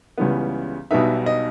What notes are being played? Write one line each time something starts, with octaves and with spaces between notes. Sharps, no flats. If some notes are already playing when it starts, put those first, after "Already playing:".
C#2 C#3 E3 G3 B3
B1 B2 G3 B3 D#4 E5
D#5